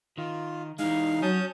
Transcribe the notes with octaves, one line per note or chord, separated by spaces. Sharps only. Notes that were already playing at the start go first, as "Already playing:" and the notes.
D#3 F4
E3 G#3 D#4 F5
F#3 C#5 G#5 A5 D#6 G6